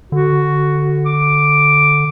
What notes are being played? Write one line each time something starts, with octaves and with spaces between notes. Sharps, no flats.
D3 F#4
D6